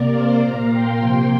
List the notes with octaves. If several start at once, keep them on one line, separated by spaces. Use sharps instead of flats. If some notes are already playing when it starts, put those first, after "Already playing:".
Already playing: C3 A#3 A#4 D5
C5 F5
A#2 A#3 F5 A#5
G5 C6
C3 F3 A#3 G5 C6